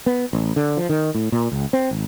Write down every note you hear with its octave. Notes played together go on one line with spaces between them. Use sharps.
B3
A1
D3
F3
D#3
A2
A#2
C#2
C4
G#1